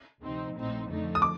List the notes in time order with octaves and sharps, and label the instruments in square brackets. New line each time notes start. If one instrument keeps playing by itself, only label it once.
[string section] D2 C3 F3 C4 D#4
A#1 A2 F3 C4 D#4
F2 D3 F3 A3 D#4
[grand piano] D#6
D6